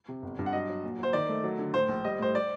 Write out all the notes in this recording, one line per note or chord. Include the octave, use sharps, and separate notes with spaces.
C3
G1
G2
F#5
F#3 D#5
F#3
A#2
F#3 C5
D#3 D5
A3
F#3
D3
A2 C5
A#1
G3 D#5
A2 C5
D5